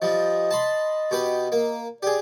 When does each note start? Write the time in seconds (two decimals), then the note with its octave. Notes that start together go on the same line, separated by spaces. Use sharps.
0.02 F3 G3 D#5
0.51 A5 B5 C6
1.11 B2 G4 B4
1.52 A#3
2.03 G4 G#4 D5